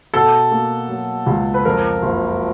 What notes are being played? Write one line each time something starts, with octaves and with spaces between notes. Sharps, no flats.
B2 A4
A#3
F#3
C#2
B4
F2 A#4
F#1